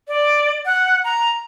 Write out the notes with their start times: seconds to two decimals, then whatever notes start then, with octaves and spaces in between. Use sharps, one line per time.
0.08 D5
0.65 F#5
1.04 A#5